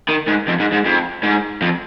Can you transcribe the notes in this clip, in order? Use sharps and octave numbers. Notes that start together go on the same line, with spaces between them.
D#3
G#2
F2
G#2
G#2
F2
G#2
F2